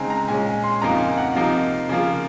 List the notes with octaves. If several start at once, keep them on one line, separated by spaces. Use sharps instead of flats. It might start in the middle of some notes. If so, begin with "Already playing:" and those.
Already playing: C#3 G#3 C4 D#4 G#5 A#5
A#5
A#2 G#3 C#4 G#5
G#5
C6
F2 C#3 F3 A#3 D#4 A#5
G#5
F#5
C3 F3 A#3 D#4 F5
C#3 F3 A#3